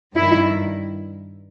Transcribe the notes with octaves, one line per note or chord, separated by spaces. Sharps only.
G2 D#3 E4